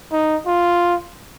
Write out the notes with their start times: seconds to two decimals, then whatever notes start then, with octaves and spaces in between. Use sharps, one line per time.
0.12 D#4
0.47 F4